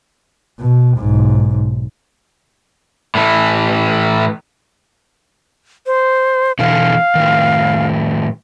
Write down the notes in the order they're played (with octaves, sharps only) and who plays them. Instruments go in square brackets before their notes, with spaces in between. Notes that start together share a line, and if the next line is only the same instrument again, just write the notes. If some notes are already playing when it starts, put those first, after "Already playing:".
[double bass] B2
B1 G#2
[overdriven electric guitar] A2 E3
[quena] C5
[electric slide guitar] B2 D3 E3 [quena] F5
[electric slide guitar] A2 D#3